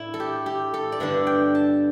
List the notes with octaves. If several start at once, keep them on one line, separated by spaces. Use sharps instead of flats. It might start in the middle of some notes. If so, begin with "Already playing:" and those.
Already playing: A2 A3 D4 E4
A4
G4
G4
A4
D5
G2 D3 B3 D4 E5
G5
A5